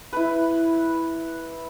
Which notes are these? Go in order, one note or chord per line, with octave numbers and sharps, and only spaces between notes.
E4 B4